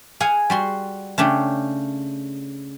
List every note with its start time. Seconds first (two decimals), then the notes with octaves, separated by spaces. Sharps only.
0.20 G#4 F5 F#5 G#5
0.50 G3 F#4 C6
1.18 C#3 A3 D4 G4